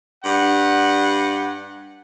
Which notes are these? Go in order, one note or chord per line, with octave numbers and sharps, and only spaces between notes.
G2 F#5